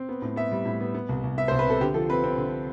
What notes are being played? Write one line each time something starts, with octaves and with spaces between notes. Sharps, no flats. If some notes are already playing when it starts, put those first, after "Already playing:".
Already playing: C4
B3
A2
B3 E5
G3
A2
B3
B3
C2
C2
B3 E5
C5
C2
B4
C3 A4
D3 G4
F3 A4
C4 B4
C4
D3